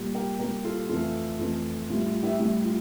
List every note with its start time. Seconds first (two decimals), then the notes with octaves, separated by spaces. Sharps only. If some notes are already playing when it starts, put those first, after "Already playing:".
Already playing: A#2 G3
0.15 G4 A#4
0.39 A#2 G3 G4 A#4
0.64 F4 A4
0.89 F2 E3 A3 F4 A4
1.39 F2 E3 A3
1.90 A2 G3 F4
2.06 F4
2.23 E4 G4
2.39 A2 G3 E4
2.65 F4